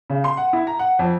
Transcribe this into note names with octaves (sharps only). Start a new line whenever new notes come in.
C#3
C6
F#5
E4
A#5
F#5
F2